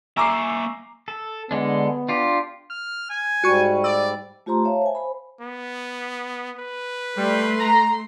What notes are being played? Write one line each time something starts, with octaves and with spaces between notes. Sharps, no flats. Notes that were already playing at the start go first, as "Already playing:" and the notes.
A#3 E5 G#5 A#5 C#6 D6 E6 C7
A4
D3 G#3 B3 D4
D4 F4 G4
F6
G#5
G#2 G3 F#4 C#6 D#7
D5 E6
A3 F4 G4 C5 A#5 C6
C#5 E5 F5 A5
C5 G#5
C5 B5
B3
B4
G3 A3 C6
A#5